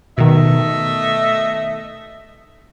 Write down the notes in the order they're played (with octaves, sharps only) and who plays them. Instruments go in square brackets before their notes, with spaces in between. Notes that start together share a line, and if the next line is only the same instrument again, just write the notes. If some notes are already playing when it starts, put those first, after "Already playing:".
[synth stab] B2 D#3 [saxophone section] A3 D#5 E5